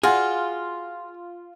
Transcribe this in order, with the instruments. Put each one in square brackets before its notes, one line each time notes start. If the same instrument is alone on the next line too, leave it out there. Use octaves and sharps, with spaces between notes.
[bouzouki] F4 [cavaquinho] F#4 [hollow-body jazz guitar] G#4